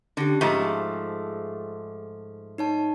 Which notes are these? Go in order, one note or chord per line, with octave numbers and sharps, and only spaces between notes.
D3 C#4 G4
G#2 F3 A3 A#5
G#4
D#4 C#5 A5